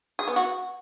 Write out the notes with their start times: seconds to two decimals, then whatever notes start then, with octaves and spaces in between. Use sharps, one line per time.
0.19 G#4
0.28 B3
0.36 F#4